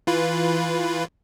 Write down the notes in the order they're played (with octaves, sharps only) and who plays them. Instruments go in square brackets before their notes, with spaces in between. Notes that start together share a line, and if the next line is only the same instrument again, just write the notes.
[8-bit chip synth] E3 F4 B4